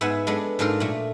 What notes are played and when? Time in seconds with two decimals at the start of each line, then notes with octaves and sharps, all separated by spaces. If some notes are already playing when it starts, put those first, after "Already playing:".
0.01 G#2 B3 E5 F#5 G#5
0.27 G#3 B3 D4 A4
0.59 G#2 D4 F4 A4 A#4
0.80 A#2 A3